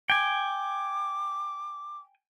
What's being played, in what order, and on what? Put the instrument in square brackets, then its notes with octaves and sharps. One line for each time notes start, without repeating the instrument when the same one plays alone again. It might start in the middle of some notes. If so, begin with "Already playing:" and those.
[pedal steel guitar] G5 G#5 [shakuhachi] D6